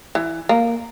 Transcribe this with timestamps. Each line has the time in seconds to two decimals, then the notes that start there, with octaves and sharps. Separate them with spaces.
0.15 E3
0.49 A#3